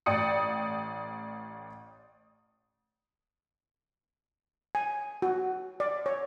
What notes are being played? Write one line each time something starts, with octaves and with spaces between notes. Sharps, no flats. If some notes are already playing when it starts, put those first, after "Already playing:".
A1 D5 G5 D#6 C#7
G#5
F#4
D5
C#5